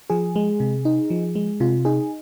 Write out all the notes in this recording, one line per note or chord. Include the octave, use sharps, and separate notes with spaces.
F3 G#4
G#3
C3
D#4
F3
G#3
C3 F4
D#4 G#4